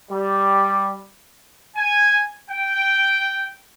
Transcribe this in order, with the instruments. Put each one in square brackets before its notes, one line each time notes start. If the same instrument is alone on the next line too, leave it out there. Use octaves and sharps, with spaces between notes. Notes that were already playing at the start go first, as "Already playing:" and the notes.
[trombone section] G3
[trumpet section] G#5
G5